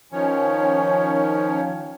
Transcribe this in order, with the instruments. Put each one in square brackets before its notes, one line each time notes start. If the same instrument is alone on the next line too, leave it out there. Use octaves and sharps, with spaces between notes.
[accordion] D#3 F3 C#4 C#5